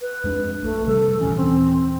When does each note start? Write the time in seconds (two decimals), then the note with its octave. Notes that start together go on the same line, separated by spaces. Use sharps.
0.01 B4
0.24 F2 G#3 D4
0.62 A#1 A3
0.87 C3 G3 A4
1.20 D#2 A#2 E3 C#4
1.37 C4